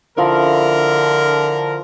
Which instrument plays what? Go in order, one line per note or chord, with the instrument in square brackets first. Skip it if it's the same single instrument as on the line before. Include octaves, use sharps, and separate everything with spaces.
[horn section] D3 A#4 [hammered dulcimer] F3 E4